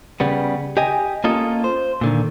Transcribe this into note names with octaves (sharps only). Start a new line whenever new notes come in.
C#3 G3 B3
G4 D#5 G#5
A#3 C#4 F4 A4 D#5
C5
A#2 D3 D#3